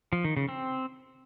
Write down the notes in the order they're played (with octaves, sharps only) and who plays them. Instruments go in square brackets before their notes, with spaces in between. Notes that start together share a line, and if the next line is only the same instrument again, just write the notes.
[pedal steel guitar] F3
D#3
C#3
C4